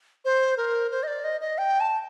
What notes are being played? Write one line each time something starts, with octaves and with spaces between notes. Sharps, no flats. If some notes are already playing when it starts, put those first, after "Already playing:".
C5
A#4
C5
D#5
D5
D#5
D#5
G5
A5